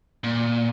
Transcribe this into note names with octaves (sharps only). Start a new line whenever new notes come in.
A#2